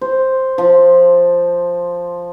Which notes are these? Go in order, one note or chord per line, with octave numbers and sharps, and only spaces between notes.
C5
F3